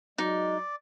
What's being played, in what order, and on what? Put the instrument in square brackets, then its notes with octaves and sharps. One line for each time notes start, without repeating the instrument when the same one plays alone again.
[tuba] F#3 [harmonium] G#3 [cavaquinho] D#4 [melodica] D5